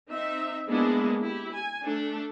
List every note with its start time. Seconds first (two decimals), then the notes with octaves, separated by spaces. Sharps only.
0.11 C4 D#4 E5
0.68 G#3 A#3 B3 D4 E4 G#4
1.20 E4 G4
1.52 G#5
1.84 A3 D4 A4